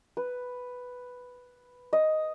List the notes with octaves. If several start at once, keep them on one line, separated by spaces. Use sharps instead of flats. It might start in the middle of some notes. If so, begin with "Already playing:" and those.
B4
D#5